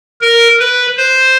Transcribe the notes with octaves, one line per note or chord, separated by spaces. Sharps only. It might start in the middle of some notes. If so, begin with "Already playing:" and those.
A#4
B4
C5